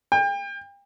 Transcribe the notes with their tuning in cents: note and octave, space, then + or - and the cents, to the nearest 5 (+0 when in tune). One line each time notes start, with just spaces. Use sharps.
G5 +35